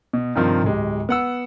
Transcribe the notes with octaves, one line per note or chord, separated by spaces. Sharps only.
B2
G2 C3 D#3 F3
D1 G#3 G4
B3 F#5 E6